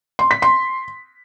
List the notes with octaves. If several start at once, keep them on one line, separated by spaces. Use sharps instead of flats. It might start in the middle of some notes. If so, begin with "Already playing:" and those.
C6
B6
C6